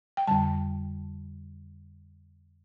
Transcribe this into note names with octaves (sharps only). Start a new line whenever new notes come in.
G5
F2 D3 G3 A5